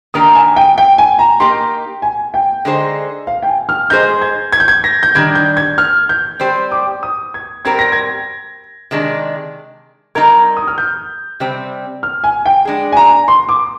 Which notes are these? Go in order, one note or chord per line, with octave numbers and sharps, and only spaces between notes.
D#3 A#3 D4 G4 A#4 D#6
G#5
G5
G5
G#5
A#5
A#3 D#4 G4 C6
G#5
G5
D3 G#3 D#4 G#4 C5
F5
G5
G#5
F6
G#3 D#4 G#4 C5 G6
G#6
G#6
G6
G#6
A#6
G6
D#3 G3 D4 G#6
G6
G#6
F6
G6
G3 C4 G4 C5
D6
D#6
G#6
G3 C4 G4 A#4 G#6
A#6
G#6
C3 D#3 G#3 D4
G3 C4 D#4 A#4 G#6
D#6
F6
G6
C3 G3 C4
F6
G#5
G5
G#3 D4 G#4
G#5
A#5
C6
D6